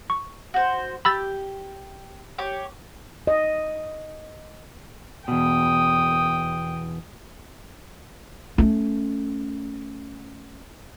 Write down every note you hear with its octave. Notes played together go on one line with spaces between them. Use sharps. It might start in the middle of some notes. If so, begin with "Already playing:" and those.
C#6
F#4 C5
G4 B5 E6 A6
G4 C#5
D#5
E2 B2 G5 D#6
A3 C#4